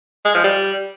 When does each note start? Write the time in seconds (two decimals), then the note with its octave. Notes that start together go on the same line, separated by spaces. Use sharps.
0.25 G#3
0.34 F3
0.44 G3